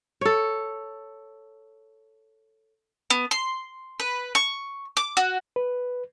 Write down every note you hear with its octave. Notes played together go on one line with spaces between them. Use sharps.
A4 C#5
B3
C6
B4
C#6
D6
F#4
B4